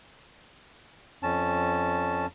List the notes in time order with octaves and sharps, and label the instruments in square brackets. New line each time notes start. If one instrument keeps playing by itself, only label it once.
[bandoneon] F2 C#4 A5